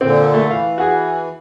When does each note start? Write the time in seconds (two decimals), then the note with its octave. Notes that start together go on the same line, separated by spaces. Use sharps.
0.01 A#2 D3 C4
0.34 A3
0.51 E3 F5
0.78 F#4 G#4